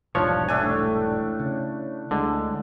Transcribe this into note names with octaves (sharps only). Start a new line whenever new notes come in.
E1 C2 G#2 F3 D4 C#5
A2 A3 D4 G#5
C#3
D2 D3 G#3